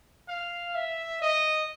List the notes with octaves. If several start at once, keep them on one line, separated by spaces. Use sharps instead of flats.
F5
E5
D#5